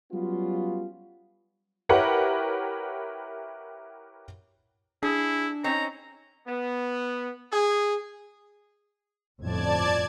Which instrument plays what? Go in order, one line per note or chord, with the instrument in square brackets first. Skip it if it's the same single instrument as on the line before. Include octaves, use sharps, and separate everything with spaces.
[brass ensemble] F#3 G3 B3 C#4 F4
[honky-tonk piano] E4 G4 A#4 B4 C#5 F#5
[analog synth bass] D4 [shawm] E4 [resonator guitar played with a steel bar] G#4
[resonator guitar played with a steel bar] C4 C#4 D#4 [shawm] A#5
[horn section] B3
G#4
[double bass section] G1 F2 A2 [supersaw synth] D5 A5 G#6